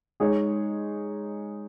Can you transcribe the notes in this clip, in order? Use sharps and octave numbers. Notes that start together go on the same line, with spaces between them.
G#3 D#4 G#4 C#5